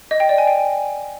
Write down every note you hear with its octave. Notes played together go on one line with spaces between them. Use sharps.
D#5
G5
D5
G#5
G5